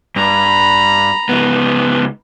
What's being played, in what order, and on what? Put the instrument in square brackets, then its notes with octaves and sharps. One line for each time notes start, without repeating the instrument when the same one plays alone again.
[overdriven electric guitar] G2 [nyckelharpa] A#5 B5
[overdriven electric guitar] C#2 B3